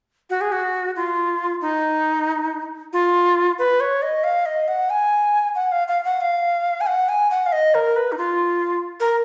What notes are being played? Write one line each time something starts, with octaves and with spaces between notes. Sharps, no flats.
F#4
G#4
F#4
F4
D#4
F4
B4
C#5
D#5
F5
D#5
F#5
G#5
F#5
F5
F5
F#5
F5
G#5
F#5
G#5
F#5
F5
D#5
A#4
B4
D#4
F4
A#4